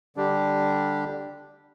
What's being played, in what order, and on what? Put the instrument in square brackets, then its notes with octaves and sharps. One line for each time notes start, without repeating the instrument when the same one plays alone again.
[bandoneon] D3 G3 D4 G4